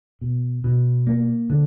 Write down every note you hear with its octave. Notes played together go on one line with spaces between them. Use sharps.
B2
B2
A#3
D3